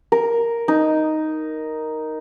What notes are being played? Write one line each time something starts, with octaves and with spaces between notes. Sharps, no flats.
A#4
D#4